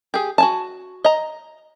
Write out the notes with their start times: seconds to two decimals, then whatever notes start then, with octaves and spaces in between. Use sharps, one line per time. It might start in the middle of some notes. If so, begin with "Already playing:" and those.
0.14 G4 G#4
0.38 F#4 G#5 A5
1.04 D#5 A#5